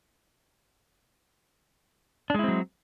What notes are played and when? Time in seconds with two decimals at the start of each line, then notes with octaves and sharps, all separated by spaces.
2.30 D4
2.34 G#3
2.39 E4
2.44 C4
2.48 F#3